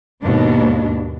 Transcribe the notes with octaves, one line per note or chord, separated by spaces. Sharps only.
D#2 G#2 B2 D4